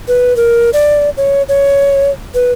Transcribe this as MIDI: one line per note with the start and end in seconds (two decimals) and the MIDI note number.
0.08 0.35 71
0.36 0.70 70
0.73 1.10 74
1.17 1.42 73
1.49 2.10 73
2.34 2.52 71